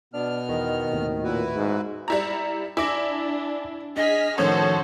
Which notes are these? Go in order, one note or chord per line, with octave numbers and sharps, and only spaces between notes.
B2 B3 D4 F6
E2 D#3
D#2 A2 C3
A#2 E4 F#4 B4
G#2
G3 E4 A#5
D4 E4 G#5 D6 A#6
D4 G#4 D#5 F6 B6
A2 D#3 F3 C#4 F#4 A4 C5 C#5